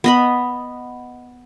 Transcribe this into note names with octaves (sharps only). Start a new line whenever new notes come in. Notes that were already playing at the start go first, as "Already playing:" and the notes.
B3 D#5 B5